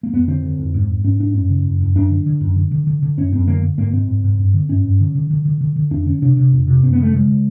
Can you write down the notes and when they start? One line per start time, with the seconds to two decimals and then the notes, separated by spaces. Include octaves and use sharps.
0.03 A#3
0.13 F2 B3
0.28 D3 C4
0.43 D3
0.59 F2
0.74 G#2
0.88 G#2
1.04 G#2 C#4
1.20 G#2 D4
1.34 F#2 C#4
1.49 C#3
1.65 F#2
1.81 F#2
1.95 F#2 D4
2.10 D3
2.26 D3
2.41 F#2
2.56 D3
2.71 D3
2.87 D3
3.02 D3
3.17 F#2 C#4
3.33 F#2 C4
3.47 D3 A#3
3.62 D3
3.78 G#2 A#3
3.93 G#2 C4
4.08 G#2
4.24 G#2
4.39 G2
4.54 D3
4.69 G2 C#4
4.85 G2
5.00 D3
5.15 D3
5.30 D3
5.45 D3
5.61 D3
5.76 D3
5.91 F2 D4
6.06 D3 C#4
6.22 C3 D4
6.37 C3
6.52 F2
6.67 C3
6.83 F#2 C4
6.92 B3
6.98 C#3 A3
7.13 C#3 G#3
7.28 C#3